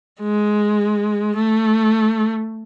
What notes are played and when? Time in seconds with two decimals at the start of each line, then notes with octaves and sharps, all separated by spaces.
0.21 G#3
1.36 A3